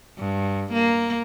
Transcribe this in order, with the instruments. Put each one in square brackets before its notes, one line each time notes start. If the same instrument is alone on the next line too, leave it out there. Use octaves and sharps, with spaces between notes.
[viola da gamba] G2
A#3